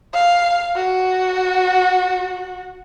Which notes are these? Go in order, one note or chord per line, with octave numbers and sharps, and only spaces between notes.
F5
F#4